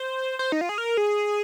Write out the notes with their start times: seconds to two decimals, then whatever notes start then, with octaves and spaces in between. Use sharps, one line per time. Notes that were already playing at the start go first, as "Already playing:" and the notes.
Already playing: C5
0.39 C5
0.52 D#4
0.61 F4
0.69 G#4
0.78 A#4
0.97 G#4